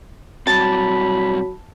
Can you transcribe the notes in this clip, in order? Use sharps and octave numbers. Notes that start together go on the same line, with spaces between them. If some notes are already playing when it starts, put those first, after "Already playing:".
B2 F#3 G3 C4 A5 B5